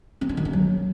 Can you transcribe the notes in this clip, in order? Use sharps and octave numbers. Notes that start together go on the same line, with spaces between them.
C4
D4
D#3
A#3
F#3